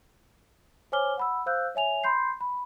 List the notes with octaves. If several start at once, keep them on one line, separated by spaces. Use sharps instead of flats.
C5 C#5 G#5 D6 F6 G7
F#5 B5 E6
C5 F5 E6 F#6 G6
C#5 E5 G#5 F7
B5 C6 G6 C7
B5